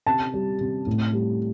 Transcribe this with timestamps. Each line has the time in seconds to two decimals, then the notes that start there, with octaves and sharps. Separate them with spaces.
0.07 C3 A5
0.34 G3
0.61 C3
0.87 A2
1.13 G3